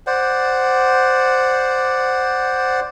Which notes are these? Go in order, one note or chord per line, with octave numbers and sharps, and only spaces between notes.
C5 D5 F#5